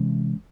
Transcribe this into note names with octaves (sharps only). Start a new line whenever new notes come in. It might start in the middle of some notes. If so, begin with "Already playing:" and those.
Already playing: C3 E3 G#3 C#4